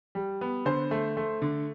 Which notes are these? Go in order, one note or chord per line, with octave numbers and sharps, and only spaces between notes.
G3
B3
D3 C5
A3
A3
D3